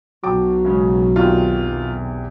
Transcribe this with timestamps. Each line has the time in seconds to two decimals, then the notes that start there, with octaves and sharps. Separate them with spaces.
0.24 B1 F#3 G5 A5 D6
0.65 C#3 G#3 C#4
1.16 E2 C3 D#3 F4